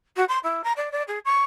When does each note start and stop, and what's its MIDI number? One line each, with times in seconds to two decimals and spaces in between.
0.16 0.24 66
0.28 0.39 84
0.43 0.62 64
0.64 0.72 82
0.76 0.91 74
0.92 1.02 74
1.08 1.19 68
1.25 1.43 85